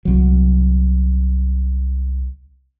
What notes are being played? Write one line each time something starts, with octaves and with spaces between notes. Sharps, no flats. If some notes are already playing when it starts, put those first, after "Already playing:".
C2 F#3